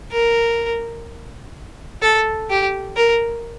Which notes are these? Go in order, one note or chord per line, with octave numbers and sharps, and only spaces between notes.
A#4
A4
G4
A#4